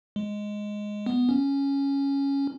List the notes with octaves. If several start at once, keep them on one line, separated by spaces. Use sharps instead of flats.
G#3
B3
C#4